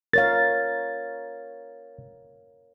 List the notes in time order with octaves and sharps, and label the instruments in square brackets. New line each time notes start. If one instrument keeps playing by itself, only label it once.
[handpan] A#4 C#5 F5 [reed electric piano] A6